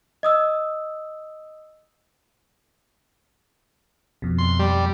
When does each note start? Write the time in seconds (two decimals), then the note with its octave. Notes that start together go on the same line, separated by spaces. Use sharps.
0.23 D#5 D#6 E6
4.22 F2 B2
4.38 C6
4.59 G3